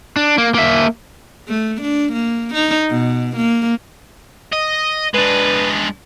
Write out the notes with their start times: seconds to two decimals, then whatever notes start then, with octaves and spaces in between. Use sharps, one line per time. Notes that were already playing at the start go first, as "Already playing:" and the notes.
0.16 D4
0.38 A#3
0.54 A#3 E5
1.48 A3
1.81 D4
2.12 A#3
2.54 D#4
2.90 B2
3.36 A#3
4.53 D#5
5.14 G#3 D4 B4